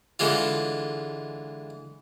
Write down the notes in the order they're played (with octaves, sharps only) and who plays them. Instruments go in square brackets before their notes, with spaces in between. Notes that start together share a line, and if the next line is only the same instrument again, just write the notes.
[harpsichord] D3 E3 G#3 F4